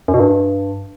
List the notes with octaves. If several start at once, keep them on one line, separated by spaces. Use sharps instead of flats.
F#2
B2
G2